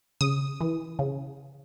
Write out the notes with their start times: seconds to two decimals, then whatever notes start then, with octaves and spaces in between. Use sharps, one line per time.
0.21 C#3 D#6
0.61 E3
0.99 C#3